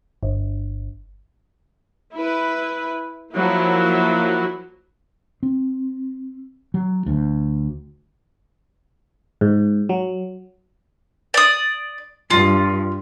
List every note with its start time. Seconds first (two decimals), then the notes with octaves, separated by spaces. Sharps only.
0.23 G1
2.14 E4 B4
3.34 F3 F#3 A#3 E4
5.43 C4
6.74 F#3
7.06 D2
9.41 G#2
9.89 F#3
11.34 D5 D#6
12.30 G2 F4